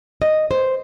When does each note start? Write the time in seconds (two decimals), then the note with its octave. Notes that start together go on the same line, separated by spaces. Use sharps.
0.22 D#5
0.51 C5